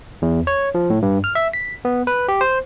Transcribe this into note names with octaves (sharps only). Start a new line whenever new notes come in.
E2
C#5
F3
A2
G2
F6
E5
B6
B3
B4
G4
C5